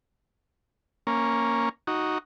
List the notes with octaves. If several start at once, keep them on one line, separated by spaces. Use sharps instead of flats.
A#3 C#4
D#4 F#4